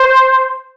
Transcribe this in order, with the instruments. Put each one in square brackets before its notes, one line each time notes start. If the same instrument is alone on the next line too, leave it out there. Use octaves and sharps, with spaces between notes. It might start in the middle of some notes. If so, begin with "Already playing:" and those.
Already playing: [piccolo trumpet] C5